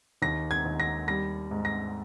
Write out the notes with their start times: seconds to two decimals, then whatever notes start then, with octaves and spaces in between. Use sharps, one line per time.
0.22 D#2 A#6
0.51 G#6
0.66 D#2
0.80 A#6
1.08 G3 A#6
1.51 G#2
1.65 A#6